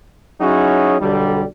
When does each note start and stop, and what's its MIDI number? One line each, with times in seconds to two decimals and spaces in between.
0.41 0.96 54
0.41 0.96 61
0.41 0.96 63
0.41 0.96 64
0.41 0.96 66
0.41 0.96 68
1.00 1.43 35
1.00 1.43 50
1.00 1.43 55